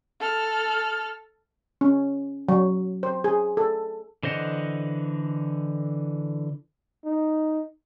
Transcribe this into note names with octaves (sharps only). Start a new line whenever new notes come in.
A4 F6
C#4
F#3
C5
G#4
A4
D3 E3 C5 D#5 F#5
D#4